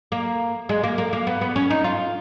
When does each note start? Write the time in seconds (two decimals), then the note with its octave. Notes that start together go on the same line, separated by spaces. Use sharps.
0.12 A#3
0.69 G#3
0.84 A#3
0.98 A#3
1.13 A#3
1.27 B3
1.41 B3
1.56 C#4
1.70 D#4
1.84 F4